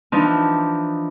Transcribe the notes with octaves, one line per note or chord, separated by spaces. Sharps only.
E3 F3 D4 D#4